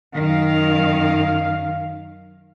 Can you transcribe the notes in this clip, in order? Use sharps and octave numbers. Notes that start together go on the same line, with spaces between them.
F#2 D#3 F5